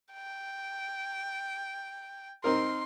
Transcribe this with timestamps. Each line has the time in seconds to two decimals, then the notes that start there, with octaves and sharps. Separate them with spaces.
0.13 G5
2.44 C4 D#4 A#4 C6